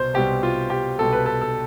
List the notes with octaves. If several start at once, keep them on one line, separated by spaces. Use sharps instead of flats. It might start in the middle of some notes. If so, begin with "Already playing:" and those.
Already playing: C2 B2 C5
C2 B2 G3 G4
F4
G4
C2 B2 G3 A4
B4
A4
A4